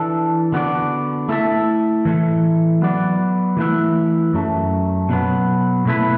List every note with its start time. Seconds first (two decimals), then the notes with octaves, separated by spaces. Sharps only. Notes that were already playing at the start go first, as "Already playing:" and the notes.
Already playing: E3 D4 A4
0.52 D3 B3 F#4 D5
1.28 A3 E4 A4 E5
2.05 A2 E3 A3
2.81 F#3 B3 F#4 D5
3.57 E3 A3 E4 B4 E5
4.33 F#2 F#3 A3
5.09 B2 F#3 B3
5.85 B2 A3 E4 B4